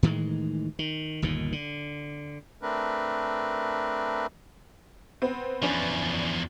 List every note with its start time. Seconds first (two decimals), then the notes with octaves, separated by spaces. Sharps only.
0.03 A2 D#3 E3 G#3
0.79 D#3
1.22 G1 D#2 A#2 D#3
1.52 D3
2.62 A3 C4 D4 A#4 B4
5.22 B3 C4
5.62 E2 F3 C#4 D4 B4